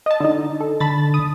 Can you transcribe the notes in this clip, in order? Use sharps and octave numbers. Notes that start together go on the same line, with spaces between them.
D#5 A5
D3 D#4
A4
D3 A5 B5 A6
D#6